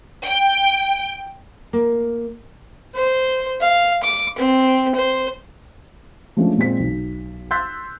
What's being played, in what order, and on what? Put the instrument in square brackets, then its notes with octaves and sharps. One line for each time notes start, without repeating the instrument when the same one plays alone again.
[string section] G5
[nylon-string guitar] A#3
[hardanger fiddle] C5
F5
D6
C4
C5
[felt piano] F3 G#3 A3 C#4 D4
A#2 G#3 C4 B6
B1
C6 E6 F#6 G6 A6 B6